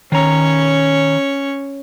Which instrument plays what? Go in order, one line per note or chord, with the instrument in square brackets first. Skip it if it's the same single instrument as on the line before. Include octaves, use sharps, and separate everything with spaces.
[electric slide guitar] D#3 A#5 [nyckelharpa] C#4 C#5